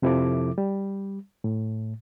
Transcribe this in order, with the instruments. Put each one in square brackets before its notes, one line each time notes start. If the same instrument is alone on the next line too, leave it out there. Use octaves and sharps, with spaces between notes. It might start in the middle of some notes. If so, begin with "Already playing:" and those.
[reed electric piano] F2 C3 F3 E4 A4 D6
G3
A2